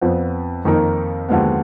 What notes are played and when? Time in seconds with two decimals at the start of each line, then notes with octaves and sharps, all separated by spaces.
0.01 F2 F3 B3
0.65 F2 D#3 A#3 D#4 A#4
1.29 D#2 D3 F3 G#3 B3